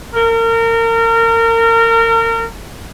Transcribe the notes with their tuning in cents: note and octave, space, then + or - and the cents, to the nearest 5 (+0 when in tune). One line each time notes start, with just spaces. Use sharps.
A#4 -30